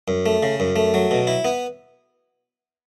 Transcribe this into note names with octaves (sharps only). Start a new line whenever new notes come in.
F#2
A3
C#3
F#2
A3
F#3
B2
E4
B3